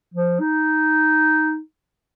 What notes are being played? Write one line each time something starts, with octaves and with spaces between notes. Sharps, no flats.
F3
D#4